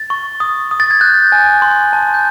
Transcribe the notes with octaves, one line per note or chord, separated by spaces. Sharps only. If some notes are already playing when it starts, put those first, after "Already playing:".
Already playing: A6
C#6
D#6
D#6
A6
G#6
F#6 G6
G#5
C6
A5
G6